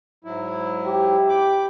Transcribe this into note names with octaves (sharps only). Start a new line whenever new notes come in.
G#2 F#3 E4
G4
G5 B5 D6